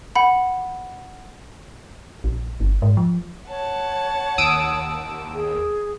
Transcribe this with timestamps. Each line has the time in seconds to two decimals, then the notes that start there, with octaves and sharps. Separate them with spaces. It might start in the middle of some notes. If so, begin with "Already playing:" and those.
0.15 F#5 B5
2.24 A#1
2.60 G1
2.82 G#2
2.97 F3
3.49 C#5 F#5 A5
4.38 D#2 D#6 E6 D7
5.34 G#4